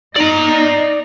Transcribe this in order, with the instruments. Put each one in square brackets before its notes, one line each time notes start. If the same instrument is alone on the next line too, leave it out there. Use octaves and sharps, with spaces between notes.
[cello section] D#4 [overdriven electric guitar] D5 A#5